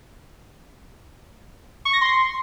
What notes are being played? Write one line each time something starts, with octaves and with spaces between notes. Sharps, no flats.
C#6
A#6
C6